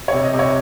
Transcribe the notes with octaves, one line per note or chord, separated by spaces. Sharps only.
C3 C#5
D#5
C3
C#5